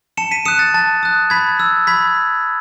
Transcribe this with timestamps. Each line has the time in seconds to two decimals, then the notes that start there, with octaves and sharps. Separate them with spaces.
0.17 A5 C#7 E7
0.31 B6 D#7
0.45 D#6 F#6 C#7 E7
0.59 A6
0.74 A5 A6
1.03 D#6 F#6
1.30 B5 G#6 B6
1.60 E6
1.87 B5 G#6 B6